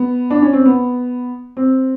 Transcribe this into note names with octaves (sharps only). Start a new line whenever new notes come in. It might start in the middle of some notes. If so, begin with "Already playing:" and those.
Already playing: B3
D4
C#4
C4
B3
C4